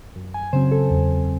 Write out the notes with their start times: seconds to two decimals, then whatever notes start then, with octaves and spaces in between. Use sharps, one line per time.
0.16 F#2
0.34 G#5
0.53 C#3 F#3 C4 C5
0.72 A4
0.91 E2